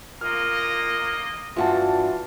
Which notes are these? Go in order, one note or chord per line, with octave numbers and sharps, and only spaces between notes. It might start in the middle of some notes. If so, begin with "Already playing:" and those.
A#2 A#3 D#5 F6
G2 E3 F4 F#4 A5